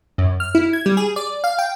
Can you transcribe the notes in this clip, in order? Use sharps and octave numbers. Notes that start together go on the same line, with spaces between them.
F#2
F6
E4
G#6
G3
G#4
D5
F5
G5